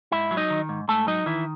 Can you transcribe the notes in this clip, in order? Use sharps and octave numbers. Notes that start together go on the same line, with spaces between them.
G#2 E4 E5
F#3
D#4 D#5
D#3
G#2
G#2 A3 A4
F#3 D#4 D#5
D#3 E3 E4